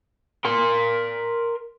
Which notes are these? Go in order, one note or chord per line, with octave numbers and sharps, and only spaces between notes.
A#4 C6